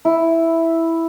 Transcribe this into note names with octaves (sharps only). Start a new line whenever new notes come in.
E4